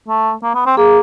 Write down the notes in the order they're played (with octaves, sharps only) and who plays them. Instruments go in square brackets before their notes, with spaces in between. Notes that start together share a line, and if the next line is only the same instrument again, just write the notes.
[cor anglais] A3
A#3
B3
C4
[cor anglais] A#3 [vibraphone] G#4